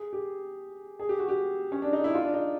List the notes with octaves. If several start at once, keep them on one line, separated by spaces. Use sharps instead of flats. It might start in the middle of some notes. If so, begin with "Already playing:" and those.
Already playing: G#4
G4
G#4
G4
F#4
G4
C#4
D4
D#4
E4
F4
D4
D#4